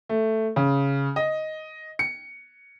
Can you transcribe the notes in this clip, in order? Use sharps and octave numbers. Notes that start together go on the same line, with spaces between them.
A3
C#3
D#5
C#7